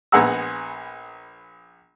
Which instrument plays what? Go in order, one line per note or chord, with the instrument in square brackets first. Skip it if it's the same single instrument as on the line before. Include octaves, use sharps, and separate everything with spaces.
[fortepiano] A#1 B3 G#4 F#5 A#5 E6